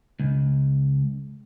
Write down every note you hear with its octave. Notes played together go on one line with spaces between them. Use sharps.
C#2